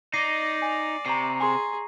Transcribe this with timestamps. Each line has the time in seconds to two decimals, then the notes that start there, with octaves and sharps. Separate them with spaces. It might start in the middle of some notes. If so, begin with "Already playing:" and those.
0.13 D#4 D5 A#6 C7 D#7
0.62 G#5
1.06 C3 A#5 C#6 C7
1.40 G#4 G#5 C6